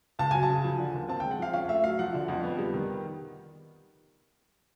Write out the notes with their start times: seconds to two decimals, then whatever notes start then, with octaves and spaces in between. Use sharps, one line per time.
0.19 C#2 A5
0.31 F#3 G#5
0.43 A5
0.49 C#3
0.64 F3
0.79 D3
0.94 D#2
1.09 C4 A5
1.20 G#3 G5
1.31 F#5
1.39 F3 F5
1.53 C#4 F5
1.69 A3 E5
1.84 F#3 F5
1.99 F3 F#5
2.14 D3
2.28 F2
2.44 B3
2.59 G3
2.74 D#3